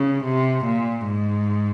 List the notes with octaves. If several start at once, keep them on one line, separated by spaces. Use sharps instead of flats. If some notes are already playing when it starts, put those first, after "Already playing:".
Already playing: C#3
C3
A#2
G#2